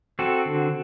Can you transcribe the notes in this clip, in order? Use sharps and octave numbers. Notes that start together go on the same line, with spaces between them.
C4 F#4 A4
D3